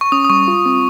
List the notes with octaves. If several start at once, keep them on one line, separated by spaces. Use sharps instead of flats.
C#6
C#4 D#6
D#6
G3 C#6
F4
C4